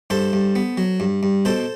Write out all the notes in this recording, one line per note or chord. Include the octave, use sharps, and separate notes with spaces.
G2 A4 C5
G2
B3
F#3
G2
G2
B2 A4 C5